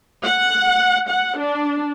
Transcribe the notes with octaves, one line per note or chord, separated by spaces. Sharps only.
F#5
F#5
D4